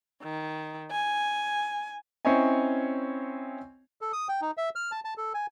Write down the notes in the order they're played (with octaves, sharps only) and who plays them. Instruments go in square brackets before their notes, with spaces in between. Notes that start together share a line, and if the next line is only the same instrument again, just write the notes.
[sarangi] D#3
G#5
[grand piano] C4 C#4 E4 C#5 D#5 G#5
[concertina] A4
D#6
G5
D#4
E5
F6
A5
A5
A4
G#5